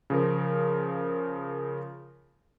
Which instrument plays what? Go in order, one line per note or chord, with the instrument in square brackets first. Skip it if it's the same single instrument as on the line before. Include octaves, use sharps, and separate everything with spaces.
[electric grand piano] C#3 F3 A#4